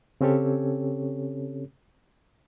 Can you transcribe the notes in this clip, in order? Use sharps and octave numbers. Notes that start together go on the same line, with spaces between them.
C#3 C4 C#4 G4 A4 C#5